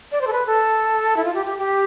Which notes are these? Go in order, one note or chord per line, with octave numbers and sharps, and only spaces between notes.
D5
C5
A4
B4
A4
E4
F4
G4
G4
G4